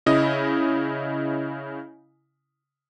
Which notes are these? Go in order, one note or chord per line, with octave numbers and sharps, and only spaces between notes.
C#3 E4 D#5